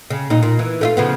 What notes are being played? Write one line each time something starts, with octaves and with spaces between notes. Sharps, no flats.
C#3
A#2 D#4
A#2
E3
A3 E4 F4
C#3 F3 B3